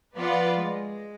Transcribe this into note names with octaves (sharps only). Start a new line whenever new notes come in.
F3 B3 F4 B4 D5
G#3